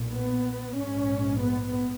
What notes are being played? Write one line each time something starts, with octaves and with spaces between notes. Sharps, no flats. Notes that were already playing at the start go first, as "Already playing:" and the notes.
Already playing: B1 A#2
B3
A#1 G#2 C#4
B3